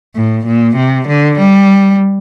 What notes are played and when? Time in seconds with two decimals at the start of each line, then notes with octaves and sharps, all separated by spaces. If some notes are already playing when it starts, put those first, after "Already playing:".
0.15 A2
0.46 A#2
0.76 C3
1.07 D3
1.39 G3